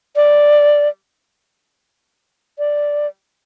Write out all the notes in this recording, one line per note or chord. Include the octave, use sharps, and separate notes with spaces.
D5
D5